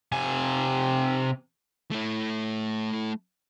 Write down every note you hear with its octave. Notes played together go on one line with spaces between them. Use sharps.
C3 G#5
A3 E4